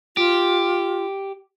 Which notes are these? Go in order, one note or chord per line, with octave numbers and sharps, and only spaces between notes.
F4 G4